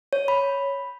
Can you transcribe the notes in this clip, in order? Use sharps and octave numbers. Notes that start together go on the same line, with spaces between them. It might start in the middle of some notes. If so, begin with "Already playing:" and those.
C#5
B5